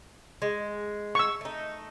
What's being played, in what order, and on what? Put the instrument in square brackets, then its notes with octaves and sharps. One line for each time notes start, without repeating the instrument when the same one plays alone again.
[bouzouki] G#3
[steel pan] C#6 E6
[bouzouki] A3 D#4